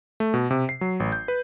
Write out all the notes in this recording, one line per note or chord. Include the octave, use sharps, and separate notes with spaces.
A3
B2
C3
C7
F#3
A1
G6
B4